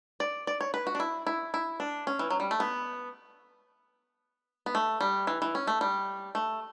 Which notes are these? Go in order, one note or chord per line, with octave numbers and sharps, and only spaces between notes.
D5
D5
C#5
B4
F#4
D4
E4
E4
E4
D4
C#4
E3
F#3
G3
A3
B3
B3
A3
G3
E3
E3
C#4
A3
G3
A3